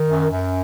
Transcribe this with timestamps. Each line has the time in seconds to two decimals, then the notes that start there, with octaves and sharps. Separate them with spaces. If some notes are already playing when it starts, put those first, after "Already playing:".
Already playing: D#3
0.09 F#2
0.31 F#2